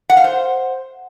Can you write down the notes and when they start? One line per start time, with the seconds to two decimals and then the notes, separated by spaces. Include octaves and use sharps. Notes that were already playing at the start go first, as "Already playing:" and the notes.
0.10 F#5
0.17 F5
0.24 C5